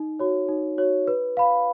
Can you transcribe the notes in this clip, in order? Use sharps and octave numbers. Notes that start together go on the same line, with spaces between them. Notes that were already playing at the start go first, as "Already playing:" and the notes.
Already playing: D#4
F#4 C#5
D#4
F#4 C#5
B4
F5 B5